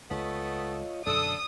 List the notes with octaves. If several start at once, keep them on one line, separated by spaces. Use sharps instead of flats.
C#2 A3 B3 F4 A4 C#5 D#5
F#2 B2 D3 D4 A4 D#6